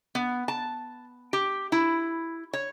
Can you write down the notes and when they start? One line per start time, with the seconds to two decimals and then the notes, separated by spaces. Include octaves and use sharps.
0.15 B3
0.48 A5
1.33 G4
1.72 E4
2.53 C#5